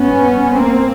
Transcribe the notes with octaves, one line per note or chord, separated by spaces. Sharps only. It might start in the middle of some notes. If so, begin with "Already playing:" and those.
Already playing: G2 B3 C#4
A#3 C4